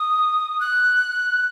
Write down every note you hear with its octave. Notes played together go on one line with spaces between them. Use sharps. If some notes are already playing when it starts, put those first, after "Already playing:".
Already playing: D#6
F#6